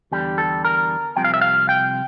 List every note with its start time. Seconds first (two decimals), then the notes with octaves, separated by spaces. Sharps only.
0.12 E2 D3 G3 G4
0.38 A4
0.65 A#4
1.17 C2 C3 F3 G5
1.24 F5
1.34 E5
1.42 F5
1.69 G5